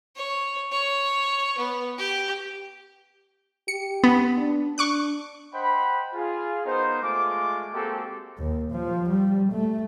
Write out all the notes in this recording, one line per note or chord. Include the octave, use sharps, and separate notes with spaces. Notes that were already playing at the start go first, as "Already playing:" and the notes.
C#5
C#5
B3
G4
G4 C#7
B3
D4
D4 C#6 D6 F#6
C5 D#5 F#5 G5 B5
F4 G#4
B3 D#4 A#4 C5
G#3 A3 F4 D6
G#3 A#3 C4 F#4 G4 A4
D#2
F3
G3
A3